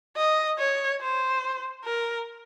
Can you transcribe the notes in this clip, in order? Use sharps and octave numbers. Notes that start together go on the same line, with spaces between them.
D#5
C#5
C5
A#4